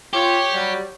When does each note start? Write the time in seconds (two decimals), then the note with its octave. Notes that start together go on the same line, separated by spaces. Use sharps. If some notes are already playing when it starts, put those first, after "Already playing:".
0.13 F4 G4 C#5
0.53 F#3 G3